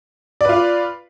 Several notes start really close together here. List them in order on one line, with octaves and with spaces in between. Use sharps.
D5 B4 F4